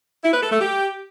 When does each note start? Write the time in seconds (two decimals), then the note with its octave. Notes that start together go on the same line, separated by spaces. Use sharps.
0.24 E4
0.33 B4
0.42 A4
0.51 A3
0.60 G4